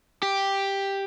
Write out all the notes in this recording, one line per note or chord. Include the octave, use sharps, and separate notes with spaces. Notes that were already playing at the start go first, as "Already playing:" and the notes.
G4